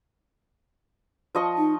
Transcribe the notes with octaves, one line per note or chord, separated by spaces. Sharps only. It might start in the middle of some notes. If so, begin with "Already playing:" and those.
F3 D#5 C#6
D#4